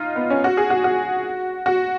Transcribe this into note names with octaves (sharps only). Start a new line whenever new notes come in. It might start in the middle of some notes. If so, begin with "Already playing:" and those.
Already playing: D#4 F4
B3
C#4
F#4
G#4
F#4
F#4
F#4